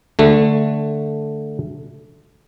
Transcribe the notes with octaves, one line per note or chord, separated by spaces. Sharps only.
D3 A3